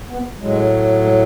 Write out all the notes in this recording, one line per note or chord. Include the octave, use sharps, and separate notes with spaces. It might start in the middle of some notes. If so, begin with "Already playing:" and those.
B3
A2 F#3 G#3
G#3